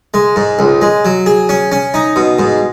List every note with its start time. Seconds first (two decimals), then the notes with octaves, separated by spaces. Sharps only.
0.14 G#3
0.36 G#2
0.59 C#2
0.82 G#3
1.05 F#3
1.26 G#4
1.49 C#4
1.72 C#4
1.94 D#4
2.16 B2
2.39 G#2